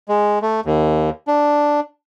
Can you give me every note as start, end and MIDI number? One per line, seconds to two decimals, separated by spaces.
0.09 0.39 56
0.42 0.60 57
0.65 1.10 39
1.27 1.80 62